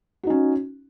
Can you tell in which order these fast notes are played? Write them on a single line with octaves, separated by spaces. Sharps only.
F#4 D#4 C#4